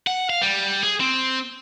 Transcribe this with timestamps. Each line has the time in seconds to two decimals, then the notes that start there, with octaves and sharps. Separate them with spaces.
0.07 F#5
0.30 F5
0.41 G3
0.83 G#4
1.00 C4